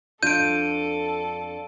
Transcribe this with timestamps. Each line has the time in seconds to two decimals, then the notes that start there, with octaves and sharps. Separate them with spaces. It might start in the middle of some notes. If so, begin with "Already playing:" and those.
0.23 F2 D4 F4 A4 G6 D7 D#7